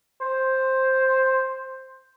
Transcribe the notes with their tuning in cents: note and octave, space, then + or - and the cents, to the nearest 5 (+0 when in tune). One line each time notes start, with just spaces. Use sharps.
C5 +5